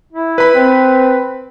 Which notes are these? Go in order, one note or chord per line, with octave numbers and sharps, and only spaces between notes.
E4
B4 B5
C4